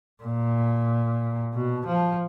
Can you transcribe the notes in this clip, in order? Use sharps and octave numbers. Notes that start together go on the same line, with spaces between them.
A#2
B2
F3